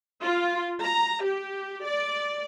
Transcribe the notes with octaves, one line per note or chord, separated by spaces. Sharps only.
F4
A#5
G4
D5